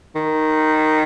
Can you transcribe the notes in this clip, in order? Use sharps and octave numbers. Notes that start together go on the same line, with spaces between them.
D#3